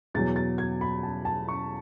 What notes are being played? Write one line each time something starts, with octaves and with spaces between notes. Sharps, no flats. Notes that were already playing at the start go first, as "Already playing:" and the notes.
E2 B2 F#3 A6
A6
G#6
B5
A5
A5
C#6